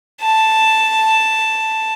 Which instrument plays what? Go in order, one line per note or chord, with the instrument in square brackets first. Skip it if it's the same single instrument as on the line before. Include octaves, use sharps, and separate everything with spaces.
[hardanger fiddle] A5